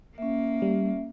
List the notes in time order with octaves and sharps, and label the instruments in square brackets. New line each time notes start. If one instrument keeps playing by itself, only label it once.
[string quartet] A#3 [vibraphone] C#4 E5
[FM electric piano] G3